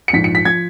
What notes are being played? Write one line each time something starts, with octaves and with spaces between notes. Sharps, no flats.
C#7
A#1 G#2 F3 B6
C#7
B6
F3 G#6